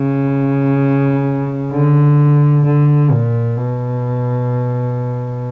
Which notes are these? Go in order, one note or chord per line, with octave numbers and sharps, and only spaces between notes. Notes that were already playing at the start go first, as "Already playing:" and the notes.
Already playing: C#3
D3
D3
A#2
B2